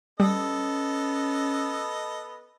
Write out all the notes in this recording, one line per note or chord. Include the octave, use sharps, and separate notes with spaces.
G3 B3 C#4 A4 D#5